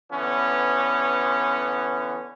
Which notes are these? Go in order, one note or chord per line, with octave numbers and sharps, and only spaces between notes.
D3 E3 B3 C#4